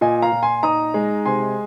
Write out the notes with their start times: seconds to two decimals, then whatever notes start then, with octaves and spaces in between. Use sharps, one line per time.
0.01 A#2 D#5 G#5
0.22 F5 A#5
0.32 A#2
0.42 G#5 C6
0.63 D#4 A#5 D#6
0.94 G#3
1.25 C3 G#5 C6